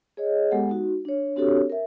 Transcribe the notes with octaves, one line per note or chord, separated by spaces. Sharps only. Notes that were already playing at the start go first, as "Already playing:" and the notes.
G#4 C#5 D#5
G#3 B3 G4 A4 F#5
D#4 F#4
D4 C#5
C4 D4 F#4 G4 A4 C#5
A#4 E5